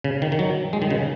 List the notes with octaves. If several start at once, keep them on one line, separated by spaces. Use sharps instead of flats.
C#3
D#3
D#3
F#3
G#3
D#3
C#3